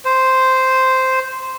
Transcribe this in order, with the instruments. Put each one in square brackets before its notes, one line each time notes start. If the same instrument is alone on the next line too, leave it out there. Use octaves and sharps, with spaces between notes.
[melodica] C5